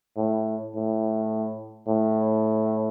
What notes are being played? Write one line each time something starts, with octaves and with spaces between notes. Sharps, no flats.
A2
A2
A2